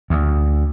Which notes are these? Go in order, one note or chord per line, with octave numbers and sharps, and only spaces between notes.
D2